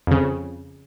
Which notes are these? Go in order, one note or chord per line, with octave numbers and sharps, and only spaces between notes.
F2 C#3